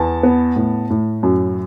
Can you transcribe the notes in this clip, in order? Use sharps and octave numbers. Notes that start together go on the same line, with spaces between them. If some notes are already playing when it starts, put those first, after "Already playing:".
Already playing: E2 A5
B3
A2
A2
F#2